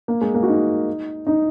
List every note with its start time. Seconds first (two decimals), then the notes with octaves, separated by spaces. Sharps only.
0.08 A#3
0.21 G#3
0.34 A#3
0.43 F#4
0.48 D#4
1.27 D#4